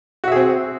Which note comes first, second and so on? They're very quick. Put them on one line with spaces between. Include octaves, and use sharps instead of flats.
F#4 E5 G#4 C4